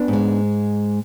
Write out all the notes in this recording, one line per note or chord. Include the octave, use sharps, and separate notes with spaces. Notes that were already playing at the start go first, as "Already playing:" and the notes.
Already playing: B3 D4
G#2 G#3